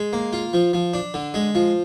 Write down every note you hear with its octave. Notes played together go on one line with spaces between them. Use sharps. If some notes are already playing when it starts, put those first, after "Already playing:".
Already playing: G#3
A#3
F4
F3
F3
D4
D3
G#3
F3